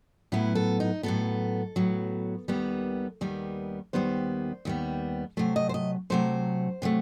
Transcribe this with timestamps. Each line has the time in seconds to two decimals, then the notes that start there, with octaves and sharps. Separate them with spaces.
0.32 A2 F#3 B3 E4
0.55 A4
0.80 D#4
1.03 A2 F#3 B3 A4
1.76 A2 F#3 B3
2.48 D#2 D#3 G3 B3
3.21 D#2 D#3 G3 B3
3.93 D#2 D#3 G3 B3 C5
4.65 D#2 D#3 G3 B3
5.37 C3 F#3 A3 C5
5.56 D#5
5.69 C5
5.74 D#5
6.10 C3 F#3 A3 C5
6.82 C3 F#3 A3